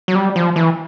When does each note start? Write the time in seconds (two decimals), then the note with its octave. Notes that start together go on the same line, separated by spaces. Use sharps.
0.08 F#3
0.15 G3
0.36 F3
0.56 E3